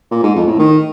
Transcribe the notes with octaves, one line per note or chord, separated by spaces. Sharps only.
A#2
G#2
F2
A2
D#3